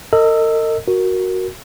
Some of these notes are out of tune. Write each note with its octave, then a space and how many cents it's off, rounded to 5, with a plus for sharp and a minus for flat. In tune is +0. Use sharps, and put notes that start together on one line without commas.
A#4 -45 D#5 +0 E6 +0
F#4 +0 A#4 +0